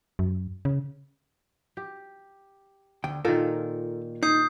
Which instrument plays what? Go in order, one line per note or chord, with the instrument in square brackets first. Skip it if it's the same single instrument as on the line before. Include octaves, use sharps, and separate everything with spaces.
[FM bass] F#2
C#3
[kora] G4
[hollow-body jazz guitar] D2 G5
[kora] A#2 D#3 [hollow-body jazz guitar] F4 A4 A#4
[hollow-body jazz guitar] D#4 [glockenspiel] D#6 G6 C7